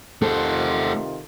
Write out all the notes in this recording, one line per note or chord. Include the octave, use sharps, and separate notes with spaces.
C3 D#3 A3 F4 A4 C5